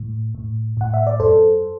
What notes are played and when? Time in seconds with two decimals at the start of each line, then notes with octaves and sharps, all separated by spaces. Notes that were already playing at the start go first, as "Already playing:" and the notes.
Already playing: A2
0.35 A2
0.77 A2 F#5
0.94 E5
1.07 D5
1.20 F#2 A4 C5